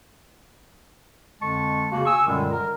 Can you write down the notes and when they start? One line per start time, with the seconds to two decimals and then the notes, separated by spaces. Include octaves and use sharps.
1.41 F2 D3 G#3 A5 C#6
1.91 C#3 A#3 F#4
2.06 G#5 C#6 D#6 E6
2.27 F#2 A#2 D3 D#3 G3 G#3
2.51 A#4